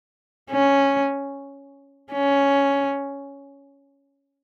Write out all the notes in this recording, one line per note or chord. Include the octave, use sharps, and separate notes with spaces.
C#4
C#4